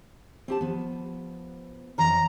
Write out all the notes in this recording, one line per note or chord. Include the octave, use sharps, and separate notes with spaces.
C4 G4 A5
F3 B3
F2 E3 C#5 A#5